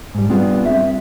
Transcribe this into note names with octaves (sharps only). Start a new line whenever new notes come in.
G#2 G3
G3 B3 C4 D4 F4 G#4
E5